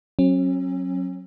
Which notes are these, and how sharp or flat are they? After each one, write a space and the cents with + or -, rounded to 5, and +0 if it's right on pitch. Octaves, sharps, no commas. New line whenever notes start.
F#3 +0 C#4 -40